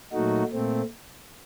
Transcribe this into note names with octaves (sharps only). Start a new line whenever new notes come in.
A#2 F#3 A3 D#4 F#4
A#2 A3 C4